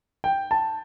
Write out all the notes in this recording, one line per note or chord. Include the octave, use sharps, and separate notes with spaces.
G5
A5